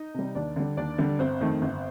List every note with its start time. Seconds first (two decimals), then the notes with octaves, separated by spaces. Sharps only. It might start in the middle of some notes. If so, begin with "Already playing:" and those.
Already playing: D#4 D#5
0.14 C3 G3
0.35 D#2 D4 D5
0.56 D3 G3
0.77 D#2 D4 D5
0.98 D3 G3
1.19 G1 C4 C5
1.40 F2 D#3 A3
1.62 G1